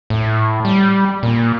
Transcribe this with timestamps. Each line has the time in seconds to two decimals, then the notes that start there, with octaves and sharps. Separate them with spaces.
0.10 A2
0.65 G3
1.23 A#2